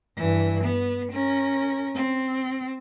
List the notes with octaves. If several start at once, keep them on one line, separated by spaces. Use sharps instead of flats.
G2 E3
B3
C#4 A#4
C4